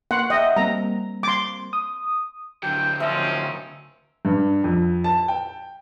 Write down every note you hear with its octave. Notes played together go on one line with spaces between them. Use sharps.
A#3 F#5 C6
D#5 E5 F#5 G5
G3 A#3 C4 A#5
C6 D6
D#6
D3 F#3 G5
F3 C4 C#4 D#4 E5
G2
F2
A5
G5